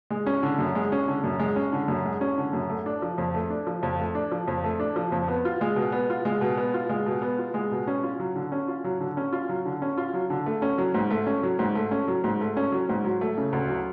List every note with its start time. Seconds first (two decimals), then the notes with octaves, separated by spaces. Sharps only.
0.11 G#3
0.26 C#4
0.43 D3
0.59 F#2
0.75 G#3
0.92 C#4
1.08 D3
1.24 F#2
1.40 G#3
1.56 C#4
1.73 D3
1.88 F#2
2.05 G#3
2.21 C#4
2.38 D3
2.53 F#2
2.69 A3
2.86 D4
3.02 F3
3.18 F2
3.34 A3
3.50 D4
3.67 F3
3.83 F2
3.99 A3
4.15 D4
4.31 F3
4.48 F2
4.64 A3
4.80 D4
4.96 F3
5.12 F2
5.28 B3
5.45 F4
5.61 G#3
5.76 B2
5.92 B3
6.10 F4
6.25 G#3
6.41 B2
6.57 B3
6.74 F4
6.89 G#3
7.06 B2
7.22 B3
7.39 F4
7.54 G#3
7.72 B2
7.87 C#4
8.03 F4
8.20 F#3
8.35 D3
8.52 C#4
8.68 F4
8.84 F#3
9.00 D3
9.17 C#4
9.33 F4
9.49 F#3
9.65 D3
9.82 C#4
9.98 F4
10.14 F#3
10.30 D3
10.46 A3
10.62 C#4
10.78 F#3
10.94 G#2
11.10 A3
11.27 C#4
11.43 F#3
11.59 G#2
11.75 A3
11.91 C#4
12.08 F#3
12.24 G#2
12.41 A3
12.57 C#4
12.72 F#3
12.89 G#2
13.04 F#3
13.21 A3
13.38 C#3
13.53 D2
13.69 F#3